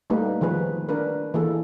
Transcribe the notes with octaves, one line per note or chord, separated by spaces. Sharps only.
G3 A3 A#3 D#4 G4 B4
D#3 F3 G#4 B4
D4 A#4 B4
E3 A#3 G#4 A4